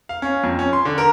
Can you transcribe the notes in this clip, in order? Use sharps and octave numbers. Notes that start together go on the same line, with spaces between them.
F5
C#4
F2
C#4
C6
D3
A#4